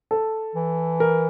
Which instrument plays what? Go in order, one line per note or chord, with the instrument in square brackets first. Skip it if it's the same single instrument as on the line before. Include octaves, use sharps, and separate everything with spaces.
[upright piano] A4
[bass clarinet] E3
[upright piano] A#4